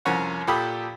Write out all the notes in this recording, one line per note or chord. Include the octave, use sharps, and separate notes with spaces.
C2 F2 C#4 A#4 C#5 F#5
A#2 G4 A4 G5 B5 D#6